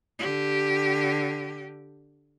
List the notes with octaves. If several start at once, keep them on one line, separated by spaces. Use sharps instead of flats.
D3 G4